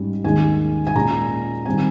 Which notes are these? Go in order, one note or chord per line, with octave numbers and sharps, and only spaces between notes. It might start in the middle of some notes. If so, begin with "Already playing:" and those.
Already playing: G#2 G3 C#4
D#2 D#3 G#3 C#4 G#5
G#5
A#2 G#3 C#4 A#5
D#3 G3 C4 G#5